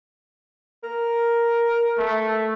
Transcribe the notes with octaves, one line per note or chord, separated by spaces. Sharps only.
A#4
A3